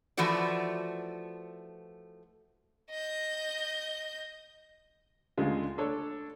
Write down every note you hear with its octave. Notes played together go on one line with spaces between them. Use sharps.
E3 F3 A3 F#4 D5
D#5 G6
D2 C#3 G#3 F4
D4 A4 C#5